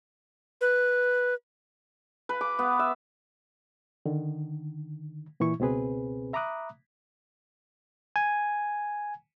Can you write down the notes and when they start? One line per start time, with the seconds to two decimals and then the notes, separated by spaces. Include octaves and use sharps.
0.61 B4
2.29 B4
2.41 D6
2.59 B3
2.79 E5
4.06 D3 D#3
5.40 A#2 E3 E4 C#6
5.60 C#2 B2 C4 G#4 B4
6.33 E5 A#5 B5 D6 D#6 F#6
8.16 G#5